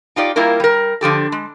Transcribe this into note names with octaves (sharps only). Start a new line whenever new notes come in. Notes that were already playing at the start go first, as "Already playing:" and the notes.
D#4 F4 G4 D5
G3 A#3 E4 F4 A#4
G3 A#4
D3 F3 G4 A4
G#3